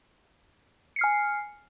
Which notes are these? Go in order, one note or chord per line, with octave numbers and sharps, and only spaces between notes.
G#5 F6 C7 C#7